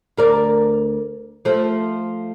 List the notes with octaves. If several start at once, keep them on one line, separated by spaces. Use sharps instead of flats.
D2 A#4 D5
F3 A3